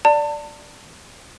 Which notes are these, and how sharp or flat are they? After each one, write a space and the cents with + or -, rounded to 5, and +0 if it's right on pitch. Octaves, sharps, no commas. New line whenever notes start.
D5 +0 A5 +35